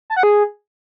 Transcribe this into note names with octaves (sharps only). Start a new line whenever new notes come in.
A5
F#5
G#4